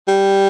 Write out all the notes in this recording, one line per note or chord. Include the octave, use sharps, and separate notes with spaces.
G3